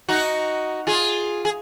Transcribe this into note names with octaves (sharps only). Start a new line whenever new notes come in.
D#4 F#4
F4 G#4
G#4